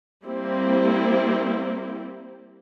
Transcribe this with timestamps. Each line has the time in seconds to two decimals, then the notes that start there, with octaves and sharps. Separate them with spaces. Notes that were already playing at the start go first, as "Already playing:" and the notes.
0.25 G3 A#3 C4 E4